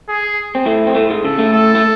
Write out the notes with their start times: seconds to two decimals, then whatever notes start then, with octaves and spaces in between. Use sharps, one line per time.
0.09 G#4
0.55 C4
0.66 A2 A3
0.87 C4
0.95 A2 A3
1.10 G#2 G#3
1.24 C#3 A4
1.39 A2 A3
1.53 A4
1.75 A3